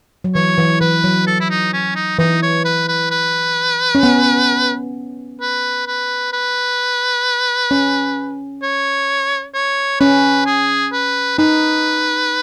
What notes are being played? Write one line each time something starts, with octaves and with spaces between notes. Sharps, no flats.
F#3
E3 C#5
E3
E3 B4
F#3
A4
E4
D#4
C#4
D#4
E3 D#4
C#5
B4
B4
B4
C#4
B3
B4
B4
B4
C#4
C#5
C#5
C#4 B4
G#4
B4
D#4 B4